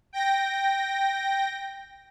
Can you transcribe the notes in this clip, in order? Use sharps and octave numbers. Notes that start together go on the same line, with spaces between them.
G5 A#6